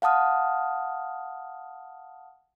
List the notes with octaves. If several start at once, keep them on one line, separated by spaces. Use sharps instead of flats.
F5 F#5 A5 D#6 F6